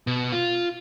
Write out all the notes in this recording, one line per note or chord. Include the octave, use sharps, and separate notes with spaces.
B2
F4